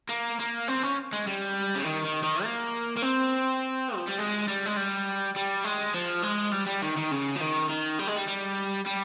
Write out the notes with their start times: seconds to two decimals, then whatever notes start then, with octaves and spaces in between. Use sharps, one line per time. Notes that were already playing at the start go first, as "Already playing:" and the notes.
0.09 A#3
0.39 A#3
0.68 C4
0.83 C#4
1.13 G#3
1.27 G3
1.76 C#3
1.85 D#3
2.05 D#3
2.23 D#3
2.44 A#3
2.97 A#3
3.02 C4
3.96 F3
4.07 G3
4.18 G#3
4.48 G3
4.66 G#3
4.77 G3
5.36 G3
5.64 G#3
5.95 F3
6.23 G#3
6.52 G3
6.67 G3
6.82 D#3
6.97 D#3
7.12 C#3
7.36 F3
7.41 D#3
7.70 D#3
7.99 G3
8.07 G#3
8.16 G3
8.28 G3
8.86 G3